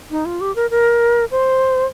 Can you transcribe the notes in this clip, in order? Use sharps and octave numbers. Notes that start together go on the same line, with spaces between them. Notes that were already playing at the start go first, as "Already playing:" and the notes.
D#4
F4
G4
A#4
A#4
C5